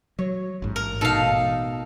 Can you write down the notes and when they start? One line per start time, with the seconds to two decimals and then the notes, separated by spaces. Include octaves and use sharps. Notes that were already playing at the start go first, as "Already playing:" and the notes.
0.19 F#3 C#5
0.62 A1 G#2
0.76 A#4
1.01 B2 D#4 A4 F5